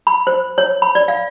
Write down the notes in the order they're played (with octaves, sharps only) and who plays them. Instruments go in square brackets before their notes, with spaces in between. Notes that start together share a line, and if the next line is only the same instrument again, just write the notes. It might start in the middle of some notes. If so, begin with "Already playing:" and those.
[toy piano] B5
C5
C#5
B5
D5
F5